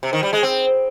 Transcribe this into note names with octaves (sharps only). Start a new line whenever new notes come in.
C3
D#3
G3
G#3
C4